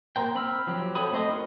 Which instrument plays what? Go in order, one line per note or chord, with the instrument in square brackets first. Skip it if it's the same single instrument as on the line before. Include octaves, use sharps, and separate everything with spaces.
[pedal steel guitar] A#3 A#4 C5 G5
C4 B5 E6 F6
F3 F#3 C4 G4
A4 C5 C#5 B5 D#6
A3 C4 C5 D#5 D#6
D#4 F#4 A#4 D#5